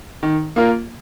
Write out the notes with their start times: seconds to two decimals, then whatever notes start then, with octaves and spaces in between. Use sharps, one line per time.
0.23 D#3
0.56 A#3 F4 A#4